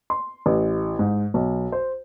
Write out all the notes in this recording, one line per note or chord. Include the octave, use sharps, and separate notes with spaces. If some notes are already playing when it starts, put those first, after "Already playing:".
C6
A1
G#2
B1
C5